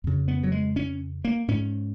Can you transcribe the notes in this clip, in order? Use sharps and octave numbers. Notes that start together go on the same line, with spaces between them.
F2 C#3
B3
F#3
G#3
C#4
A#3
G#2 C#4